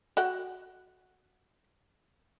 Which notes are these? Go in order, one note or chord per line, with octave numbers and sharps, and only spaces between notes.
F#4 F#5 G5